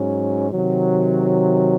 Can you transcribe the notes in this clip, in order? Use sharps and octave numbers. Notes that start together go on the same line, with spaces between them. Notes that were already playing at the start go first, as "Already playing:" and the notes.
Already playing: G#2 F#3 C#4
C3 D#3 F#3